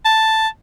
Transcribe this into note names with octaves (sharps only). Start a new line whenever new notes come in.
A5